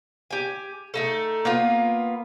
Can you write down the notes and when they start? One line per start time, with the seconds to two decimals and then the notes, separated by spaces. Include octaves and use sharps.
0.31 G4 G#5
0.94 A3 D#4 A4
1.45 A#3 B3 F4